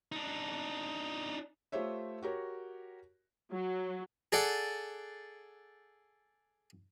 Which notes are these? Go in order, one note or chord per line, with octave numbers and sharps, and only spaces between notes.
D4 D#4
A3 F4 G4 C5 C#5 E5
F#4 G4 A#4 C#5
F#3
G#4 A4 D5 F#5